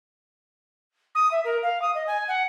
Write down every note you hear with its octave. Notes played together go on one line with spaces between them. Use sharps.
D#6
E5
A#4
F5
D#6
D#5
G#5
F#5